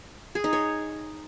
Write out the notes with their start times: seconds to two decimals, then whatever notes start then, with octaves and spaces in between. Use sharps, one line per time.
0.35 G#4
0.44 D#4
0.53 C#5